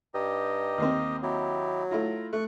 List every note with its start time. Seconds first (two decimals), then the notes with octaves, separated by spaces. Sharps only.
0.14 G2 D#4 G4 D#5
0.78 D#2 A#3 C4
1.23 F#3 D#4 E4 G4
1.91 A3 E4 F4 A#5
2.33 A3 C#6 F#6